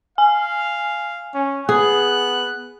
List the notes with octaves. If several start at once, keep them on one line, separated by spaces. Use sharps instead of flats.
F5 G#5
C#4
B3 G#4 F#6